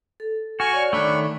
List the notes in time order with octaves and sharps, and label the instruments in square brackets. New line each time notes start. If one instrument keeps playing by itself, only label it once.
[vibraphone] A4
[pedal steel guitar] F#4 [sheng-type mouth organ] G#5 C#6 F6
[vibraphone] C#5 D5
[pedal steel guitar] D#3 A3 [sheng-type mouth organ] D4 B5 C#6